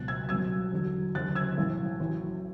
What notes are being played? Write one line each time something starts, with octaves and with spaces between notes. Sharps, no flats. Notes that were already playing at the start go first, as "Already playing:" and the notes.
Already playing: C#2 B2 F#3 F#6 A6
E6 G#6
B1 B2 F#3 E6 G#6
E2 D3 F#3
F#1 E2 D3 F#3 F#6 A6
E6 G#6
B1 A2 E3
A1 A2 F#3